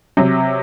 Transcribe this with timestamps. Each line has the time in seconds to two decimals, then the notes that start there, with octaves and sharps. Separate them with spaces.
0.17 C3 F#3